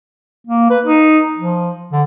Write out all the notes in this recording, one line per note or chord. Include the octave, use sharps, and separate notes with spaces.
A#3
B4
D#4
F3
D3